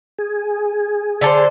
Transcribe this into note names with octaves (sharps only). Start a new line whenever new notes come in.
G#4
D3 A4 C5